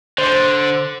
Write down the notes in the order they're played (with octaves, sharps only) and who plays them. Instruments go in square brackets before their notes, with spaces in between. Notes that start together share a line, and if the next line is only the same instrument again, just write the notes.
[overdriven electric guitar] D3 [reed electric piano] C5